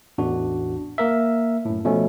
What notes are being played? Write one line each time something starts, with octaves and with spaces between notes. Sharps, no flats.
A1 E2 D4 F#4
A#3 A#4 E5
F#2 A2
B2 F3 A3 C#4